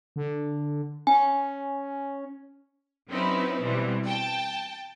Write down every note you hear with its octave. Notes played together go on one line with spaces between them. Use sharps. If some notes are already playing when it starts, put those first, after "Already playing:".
D3
C#4 G#5
F#3 C4 C#4 D#4 E4 B4
B2 E3 G3 C4
G5 A5